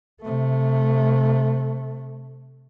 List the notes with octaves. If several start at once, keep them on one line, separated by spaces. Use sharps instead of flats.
C3 A3